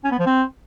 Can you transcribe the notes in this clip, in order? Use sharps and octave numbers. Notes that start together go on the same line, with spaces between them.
C#4
B3
F3
C4